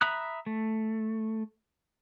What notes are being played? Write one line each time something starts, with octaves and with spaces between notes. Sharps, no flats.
E5 A#5 B5 D#6 F#6
A3